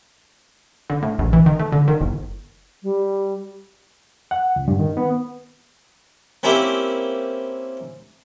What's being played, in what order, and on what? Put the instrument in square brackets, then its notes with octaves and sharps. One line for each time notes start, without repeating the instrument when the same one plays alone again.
[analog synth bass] D3
A2
A#1
E3
D#3
A3
D3
D#3
G1
[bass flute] G3
[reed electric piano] F#5
C#2
G2
D#3
B3
[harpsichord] A#3 C4 C#4 E4 G4